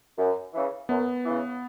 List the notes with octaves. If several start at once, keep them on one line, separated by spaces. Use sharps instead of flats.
F#2
C#3 E3
F#2 B3
C#3 E3